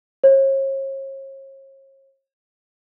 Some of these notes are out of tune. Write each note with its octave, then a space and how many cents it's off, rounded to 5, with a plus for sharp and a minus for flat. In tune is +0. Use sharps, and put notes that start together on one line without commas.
C#5 -40